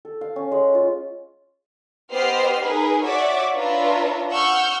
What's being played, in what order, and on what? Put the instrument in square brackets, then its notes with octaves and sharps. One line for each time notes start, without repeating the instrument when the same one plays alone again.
[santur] A4
F5
C#4
G#3
F4
[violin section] B3 G4 C5 D#5 F6 C7
D#4 G#4 A#4 B4
F#4 C#5 D5 E5 F#5 D6
D4 F4 B4 C#5 E5 A#5
F#5 C#6 E6 F6 G6